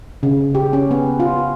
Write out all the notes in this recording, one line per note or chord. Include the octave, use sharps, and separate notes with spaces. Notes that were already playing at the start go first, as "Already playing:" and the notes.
C#3
G4
C#4
B3
F4